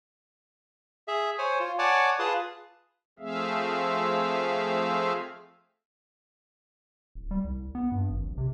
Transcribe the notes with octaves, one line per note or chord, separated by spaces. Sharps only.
G#4 E5
C5 C#5 G#5
F4
C#5 D5 F#5 G#5 A5 D6
F4 G#4 B4 A5 C6 D#6
F3 A3 C4 G#4 E5 F5
D1
G3
C2
B3
G2
G#1
A#1
C3